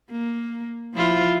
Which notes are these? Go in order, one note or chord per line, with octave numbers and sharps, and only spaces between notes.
A#3
F3 E4 F4